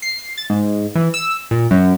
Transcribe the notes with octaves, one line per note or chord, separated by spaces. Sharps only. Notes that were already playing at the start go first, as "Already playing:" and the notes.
C7
A6
G#2
E3
E6
A#2
F#2